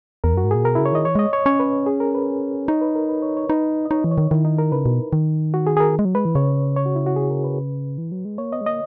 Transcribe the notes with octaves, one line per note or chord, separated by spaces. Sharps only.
E2 A#4
F#2 F#4
G#2
A#2 G#4
B2 A#4
C#3 E4
C#5
D#3 D#5
E3 C#5
G#3 D#5
C#5
C#4 C#5
B4
G#4
A#4
B4
D#4 C#5
B4
A#4
B4
C#5
C#5
D#4 B4
D#5
D#4 C#5
E3
C#5
D#3
D#3 E4
D#4
A#4
C#3 B4
B2
D#3
F#4
G#4
G#4
A#4
G#3
F#3
G#3 B4
E3
C#3 C#5
C#5
F#4
E4
F#4
G#4
A#4
B4
E3
F#3
G#3
A#3 C#5
B3 D#5
G#3
A#3 D#5